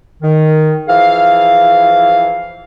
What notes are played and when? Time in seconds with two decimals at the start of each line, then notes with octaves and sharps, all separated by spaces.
0.22 D#3
0.87 E3 F3 G#4 F5